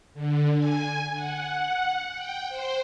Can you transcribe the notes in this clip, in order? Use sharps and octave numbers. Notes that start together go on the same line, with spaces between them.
D3
G#5
F#5
G5
C5